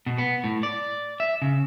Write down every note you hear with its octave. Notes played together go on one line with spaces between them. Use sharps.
B2
B3
A2
D5
E5
C#3